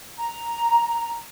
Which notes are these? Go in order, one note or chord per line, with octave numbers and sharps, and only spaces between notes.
A#5